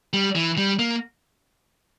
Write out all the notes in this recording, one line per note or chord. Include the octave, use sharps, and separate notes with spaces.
G3
E3
G3
A#3